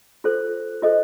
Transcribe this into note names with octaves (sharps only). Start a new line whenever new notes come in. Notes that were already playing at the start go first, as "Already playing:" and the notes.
F4 A4 C5
F4 A4 C5 D#5